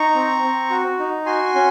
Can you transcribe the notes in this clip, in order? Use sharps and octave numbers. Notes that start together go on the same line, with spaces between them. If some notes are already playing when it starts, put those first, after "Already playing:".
Already playing: D#4 A#5 C#6
C4
C4
F#4
D#4
F#4 G#5 C6
C#4